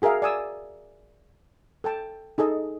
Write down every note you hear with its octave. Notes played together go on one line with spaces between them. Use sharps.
F#4 G#4 A#4 E5 F5
D5 G#5 D#6 E6
A4 G5 A5
D#4 G#4 A4 D#5